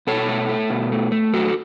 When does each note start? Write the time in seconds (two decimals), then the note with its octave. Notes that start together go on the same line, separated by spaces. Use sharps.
0.07 B2 A4 C#5
0.29 A3
0.49 A3
0.70 B2
0.92 A3
1.12 A3
1.33 F#2 F#4 A4